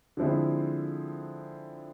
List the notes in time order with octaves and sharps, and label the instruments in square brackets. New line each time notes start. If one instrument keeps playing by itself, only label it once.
[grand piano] D3 F3 G#3 C4 E4